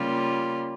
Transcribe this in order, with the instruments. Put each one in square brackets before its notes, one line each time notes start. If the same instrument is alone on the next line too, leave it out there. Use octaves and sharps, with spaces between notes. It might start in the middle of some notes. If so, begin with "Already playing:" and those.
Already playing: [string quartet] C#3 G3 A#3 F4